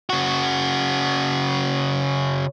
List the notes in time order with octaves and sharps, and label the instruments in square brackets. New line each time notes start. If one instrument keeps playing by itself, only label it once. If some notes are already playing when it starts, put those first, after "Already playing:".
[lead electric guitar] C#3 F#4